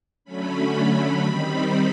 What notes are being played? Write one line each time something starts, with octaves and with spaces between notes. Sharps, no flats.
D3 F#3 A3 C#4 B5
B5
D#3 G3 C4 D#4